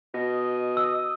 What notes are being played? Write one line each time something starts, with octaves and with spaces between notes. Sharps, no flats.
B2 D#5
E6